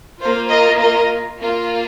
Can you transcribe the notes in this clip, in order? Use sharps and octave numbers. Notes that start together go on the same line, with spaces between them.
A#3 F4 C5
A#4 D#5
A#4 D#5
A#3 F4